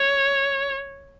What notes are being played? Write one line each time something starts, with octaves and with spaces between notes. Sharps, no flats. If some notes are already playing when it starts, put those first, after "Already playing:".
Already playing: C#5